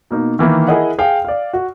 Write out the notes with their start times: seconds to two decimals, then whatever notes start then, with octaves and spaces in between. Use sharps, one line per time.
0.11 B2 A#3 D#4
0.39 D#3 E3 A#3
0.68 E4 G#4 A#4 D#5 F#5
0.98 G#4 F5 G5
1.25 D5 F5
1.53 F#4